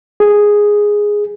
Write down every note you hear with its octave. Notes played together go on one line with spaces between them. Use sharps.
G#4